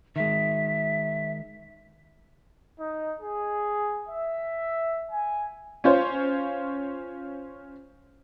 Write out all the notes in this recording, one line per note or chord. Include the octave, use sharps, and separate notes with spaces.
D#3 G#3 E5
D#4
G#4
E5
G#5
C#4 F4 C5 C#5